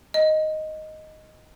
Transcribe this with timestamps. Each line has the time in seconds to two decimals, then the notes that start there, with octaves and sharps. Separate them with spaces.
0.14 D#5